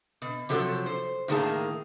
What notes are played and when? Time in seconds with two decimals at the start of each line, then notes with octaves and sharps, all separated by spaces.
0.22 B2
0.49 C3 F3 F#3 A4
0.86 C5
1.28 A2 D#3 A#3 E4 G#4 A5